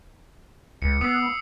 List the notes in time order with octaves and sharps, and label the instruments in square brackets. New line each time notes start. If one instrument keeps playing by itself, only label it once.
[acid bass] C#2 [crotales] C#7
[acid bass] B3 [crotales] D#6 E6 C7